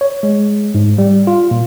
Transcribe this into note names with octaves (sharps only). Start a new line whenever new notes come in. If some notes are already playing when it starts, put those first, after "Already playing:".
C#5
G#3
G#2
G3
F4
A#2